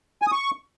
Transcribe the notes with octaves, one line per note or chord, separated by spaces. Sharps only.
G#5
D#6
C#6